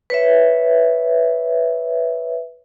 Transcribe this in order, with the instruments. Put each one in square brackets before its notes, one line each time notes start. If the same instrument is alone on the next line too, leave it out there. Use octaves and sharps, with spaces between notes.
[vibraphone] B4 C#5 E5